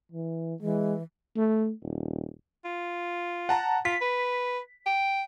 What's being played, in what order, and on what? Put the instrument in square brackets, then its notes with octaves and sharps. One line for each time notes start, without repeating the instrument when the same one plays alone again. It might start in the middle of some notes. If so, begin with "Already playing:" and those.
[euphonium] E3
[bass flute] E3 [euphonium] G#3
[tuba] A3
D#1
[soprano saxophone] F4
[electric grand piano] F#5 A5 A#5
[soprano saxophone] F4 [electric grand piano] B6
[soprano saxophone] B4
G5